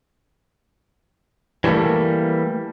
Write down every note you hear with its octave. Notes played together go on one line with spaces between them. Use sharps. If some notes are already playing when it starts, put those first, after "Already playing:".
E3 F#3 G3 A3 A#3